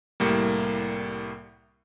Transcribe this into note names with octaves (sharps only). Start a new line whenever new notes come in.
C2 A2 G3 A#3